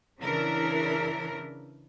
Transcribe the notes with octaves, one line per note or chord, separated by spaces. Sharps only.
C#3 E3 D4 E4 A#4